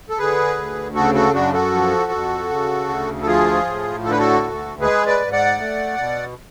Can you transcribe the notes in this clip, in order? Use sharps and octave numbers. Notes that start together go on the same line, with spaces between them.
A4
D3 G#4 B4
D2
C#3 F#4 A4
F#4 A4
F#2 D4 F#4
F#4 A4
F3
F2
C#3
D2
A4
F3 F4 G#4
A2
D3 A4
B4
F#4 A4
D2
G#3 G#4 B4
B4 D5
G#2
D5 F#5
A3
B2